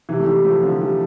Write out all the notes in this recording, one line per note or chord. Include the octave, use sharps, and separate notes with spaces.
C3 E3
A3
E3 G3
F3 A3
D3 F3
E3 G3